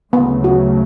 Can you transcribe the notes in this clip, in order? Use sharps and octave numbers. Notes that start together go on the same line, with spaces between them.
D2 C#3 F#3 A3 B3
F#4